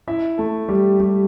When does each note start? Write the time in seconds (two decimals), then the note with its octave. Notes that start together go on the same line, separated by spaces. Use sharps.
0.08 E4 E5
0.38 A3 A4
0.69 G3 G4
1.00 G3 G4